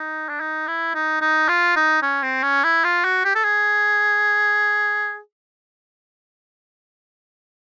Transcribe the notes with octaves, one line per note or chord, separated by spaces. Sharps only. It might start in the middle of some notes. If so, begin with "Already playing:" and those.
Already playing: D#4
D4
D#4
E4
D#4
D#4
F4
D#4
C#4
C4
C#4
E4
F4
F#4
G4
A4
G#4